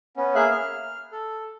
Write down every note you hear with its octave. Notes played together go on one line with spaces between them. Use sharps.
B3 C#4
A#3 G#4 E5 F5 F#6
F6
A4